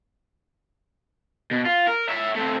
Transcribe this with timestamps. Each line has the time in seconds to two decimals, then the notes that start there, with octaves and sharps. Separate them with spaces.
1.51 B2
1.65 F4
1.87 A#4
2.09 C#5 E5
2.35 A3 C4